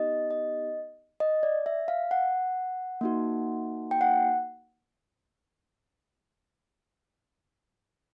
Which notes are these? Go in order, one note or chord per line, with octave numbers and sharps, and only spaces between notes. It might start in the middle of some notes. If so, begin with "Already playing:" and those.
Already playing: B3 D#4 G4 D#5
D#5
D#5
D5
E5
F5
F#5
A#3 D#4 F#4
G5
F#5